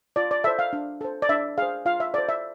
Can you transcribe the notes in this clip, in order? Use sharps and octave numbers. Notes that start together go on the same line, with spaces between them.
F4 D5
D5
A4 C5 E5
F5
D4
A4 C5
D5
D4 E5
G#4 C5 F5
F4 F5
E5
A4 C5 D5
E5